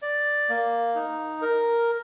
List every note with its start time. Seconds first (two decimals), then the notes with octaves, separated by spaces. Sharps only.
0.02 D5
0.49 A#3
0.95 D#4
1.42 A#4